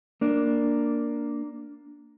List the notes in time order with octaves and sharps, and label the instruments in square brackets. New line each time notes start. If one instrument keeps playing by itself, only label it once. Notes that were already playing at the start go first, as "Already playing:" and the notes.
[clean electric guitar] A#3 D4